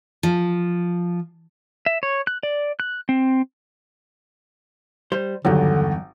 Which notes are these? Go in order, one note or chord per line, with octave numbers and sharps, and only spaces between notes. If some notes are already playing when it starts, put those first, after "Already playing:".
F3
E5
C#5
F#6
D5
F#6
C4
G3 C5
G#1 E2 G2 D3 F#3 G4